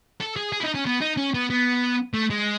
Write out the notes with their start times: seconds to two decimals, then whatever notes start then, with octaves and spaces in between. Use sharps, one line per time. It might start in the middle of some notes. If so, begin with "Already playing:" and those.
0.21 A4
0.36 G#4
0.52 G#4
0.60 E4
0.63 D#4
0.74 C#4
0.86 B3
1.01 D#4
1.17 C#4
1.34 B3
1.50 B3
2.14 A3
2.30 G#3